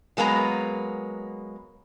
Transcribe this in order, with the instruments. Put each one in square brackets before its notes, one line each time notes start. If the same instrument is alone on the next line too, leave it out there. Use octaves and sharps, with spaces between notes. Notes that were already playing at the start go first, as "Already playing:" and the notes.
[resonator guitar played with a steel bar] F#3 G#3 A#3 B3 A#5